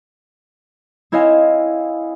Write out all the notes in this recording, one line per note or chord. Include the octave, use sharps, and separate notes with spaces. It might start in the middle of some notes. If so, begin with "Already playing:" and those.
C4 E4 C#5 D#5 F5 G#5